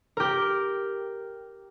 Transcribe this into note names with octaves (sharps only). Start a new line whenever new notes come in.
G4 A#4